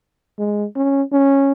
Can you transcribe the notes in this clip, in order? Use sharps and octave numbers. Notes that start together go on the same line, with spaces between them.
G#3
C#4
C#4